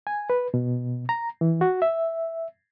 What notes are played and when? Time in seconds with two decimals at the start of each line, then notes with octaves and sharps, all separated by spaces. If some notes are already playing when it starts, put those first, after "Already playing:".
0.07 G#5
0.30 B4
0.54 B2
1.09 A#5
1.41 E3
1.61 F#4
1.82 E5